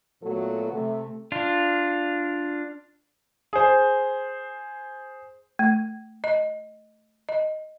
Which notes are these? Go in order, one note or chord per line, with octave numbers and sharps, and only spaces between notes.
A#2 F#3 A3 B3 F#4 A4
C3 A3
D4 F4
G#4 C5
A3
D#5
D#5